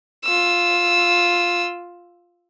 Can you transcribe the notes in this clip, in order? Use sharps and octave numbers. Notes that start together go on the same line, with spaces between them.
F4 E6